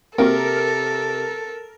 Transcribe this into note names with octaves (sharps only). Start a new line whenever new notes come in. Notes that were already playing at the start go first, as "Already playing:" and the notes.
C3 A#3 C4 F#4 A4 A#4